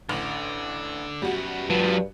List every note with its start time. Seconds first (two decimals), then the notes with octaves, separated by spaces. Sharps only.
0.09 A1 D3
1.22 F#2 G3 B3 F#4
1.70 G2 F#3 F4 F5 A5